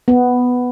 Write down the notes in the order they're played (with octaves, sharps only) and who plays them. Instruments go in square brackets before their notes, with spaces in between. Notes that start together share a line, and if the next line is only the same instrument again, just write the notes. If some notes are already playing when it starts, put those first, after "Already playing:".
[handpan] B3